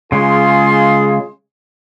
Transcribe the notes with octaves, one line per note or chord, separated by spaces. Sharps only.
C#3 G#3 F4 G#4 C6